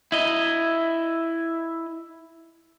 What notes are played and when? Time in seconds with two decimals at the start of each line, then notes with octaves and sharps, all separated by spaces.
0.12 E4 D#5